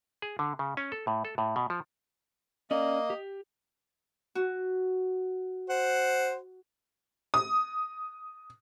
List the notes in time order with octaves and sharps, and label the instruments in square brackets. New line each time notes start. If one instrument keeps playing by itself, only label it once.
[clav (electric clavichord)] G#4
D3
C#3
C#4
A4
A2
A4
A2
B2
F3
[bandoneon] A#3 [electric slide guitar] C#4 D5 [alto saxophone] D#5
[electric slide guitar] G4
[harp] F#4
[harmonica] C5 F#5
[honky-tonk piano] D#6